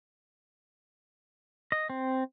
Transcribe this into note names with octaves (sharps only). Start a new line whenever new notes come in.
D#5
C4